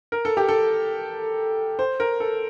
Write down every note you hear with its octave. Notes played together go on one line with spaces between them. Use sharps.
A#4
A4
G4
A4
C5
A#4
A4